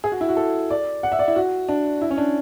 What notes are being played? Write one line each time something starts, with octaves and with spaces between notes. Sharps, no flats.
G#4
F#4
E4
F#4
A4
D5
F#5
E5
D5
E4
F#4
D4
E4
C#4
D4